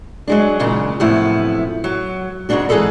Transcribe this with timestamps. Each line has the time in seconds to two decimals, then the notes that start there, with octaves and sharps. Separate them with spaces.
0.27 F#3 G#3 D4
0.60 E2 A#2 C#3 D4
1.00 F#2 A2 C3 F3 B3 E4
1.84 F#3
2.49 G#2 C#3 E3 F#3 D4 F#4
2.69 G#2 E3 D4 G#4 A4 B4